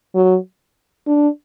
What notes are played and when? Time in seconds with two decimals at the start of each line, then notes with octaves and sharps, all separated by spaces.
0.15 F#3
1.07 D4